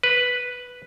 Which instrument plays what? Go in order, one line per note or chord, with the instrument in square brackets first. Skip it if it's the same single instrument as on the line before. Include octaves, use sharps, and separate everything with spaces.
[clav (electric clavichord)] B4